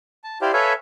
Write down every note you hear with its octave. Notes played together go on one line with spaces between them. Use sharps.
A5
E4 G4 C5 D5 F5
A4 B4 C#5 E5 F5 G#5